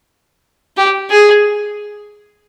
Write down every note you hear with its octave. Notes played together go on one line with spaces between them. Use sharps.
G4
G#4